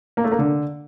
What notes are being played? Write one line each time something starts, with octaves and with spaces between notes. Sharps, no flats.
A#3
A3
A#3
D3